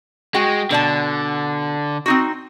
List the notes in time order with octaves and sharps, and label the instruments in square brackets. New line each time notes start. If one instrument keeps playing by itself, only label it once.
[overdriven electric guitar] G#3 [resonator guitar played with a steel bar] F#4 G5
[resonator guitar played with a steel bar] B2 D5 A5 [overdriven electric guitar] D3
[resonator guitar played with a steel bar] C4 D#4 F#4